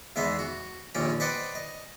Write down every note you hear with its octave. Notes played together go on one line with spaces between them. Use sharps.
E2 G#2 G#3 B3 E5 C6
F#4
A#1 D#2 A#2 C#4 G5
B4 C5 D5 D#5 F#5 G5
D#5